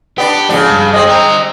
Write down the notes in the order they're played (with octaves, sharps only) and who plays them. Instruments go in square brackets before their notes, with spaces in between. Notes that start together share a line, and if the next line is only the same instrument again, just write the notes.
[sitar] B3 D4 [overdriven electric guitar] G4
[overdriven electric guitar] G#2 F3 [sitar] C#3 D4
[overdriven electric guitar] G2 G3
[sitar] G#3 C4 [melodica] D#5
[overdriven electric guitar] G3 A#5 [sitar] C4